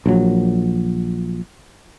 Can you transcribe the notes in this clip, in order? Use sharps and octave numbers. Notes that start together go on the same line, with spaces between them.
A#1 F#3